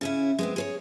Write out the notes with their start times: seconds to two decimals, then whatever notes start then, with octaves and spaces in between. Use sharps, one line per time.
0.01 C#3 C#4 E4
0.39 G#3 B3 C4
0.56 G#4 C5 C#5